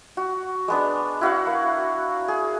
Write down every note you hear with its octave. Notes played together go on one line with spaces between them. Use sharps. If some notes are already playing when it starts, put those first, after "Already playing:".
F#4
G#3 B3 D4
E4 F#4 F5 F#5
A#3
G#4